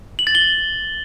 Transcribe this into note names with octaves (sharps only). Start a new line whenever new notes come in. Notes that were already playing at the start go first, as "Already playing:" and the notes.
F#7
A6
G7